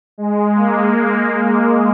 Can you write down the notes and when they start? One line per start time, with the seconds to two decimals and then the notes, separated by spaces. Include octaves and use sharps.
0.18 G#3
0.55 A#3